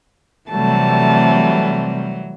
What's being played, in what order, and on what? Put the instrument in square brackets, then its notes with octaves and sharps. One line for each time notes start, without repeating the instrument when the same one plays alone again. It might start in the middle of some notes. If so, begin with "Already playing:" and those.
[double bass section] C3 G3 A3 [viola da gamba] E3 F#3 [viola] A5